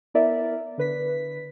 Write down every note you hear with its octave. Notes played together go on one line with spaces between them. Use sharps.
B3 E4 A#4 D5 E5
D3 B4 B6